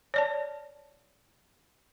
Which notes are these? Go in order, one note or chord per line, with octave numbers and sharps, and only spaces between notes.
C#5 D5 A5